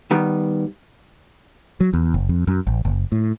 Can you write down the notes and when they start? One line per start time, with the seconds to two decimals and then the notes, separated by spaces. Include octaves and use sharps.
0.11 D#3 G3 B3
1.80 F#3
1.93 E2
2.14 F#1
2.29 F2
2.47 F#2
2.67 A1
2.85 F#1
3.12 A2